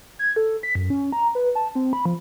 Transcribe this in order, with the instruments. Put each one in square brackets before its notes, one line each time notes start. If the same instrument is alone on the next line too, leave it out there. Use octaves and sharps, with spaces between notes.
[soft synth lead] G#6
A4
B6
F#2
C#4
A#5
B4
A5
C4
B5
F3